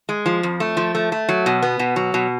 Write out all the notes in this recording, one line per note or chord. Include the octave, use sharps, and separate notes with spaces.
G#3
F3
F2
A3
F3
A3
A3
F#3
B2
B3
B2
F#3
B2